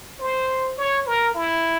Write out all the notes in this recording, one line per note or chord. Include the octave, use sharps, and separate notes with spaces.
C5
C#5
A#4
E4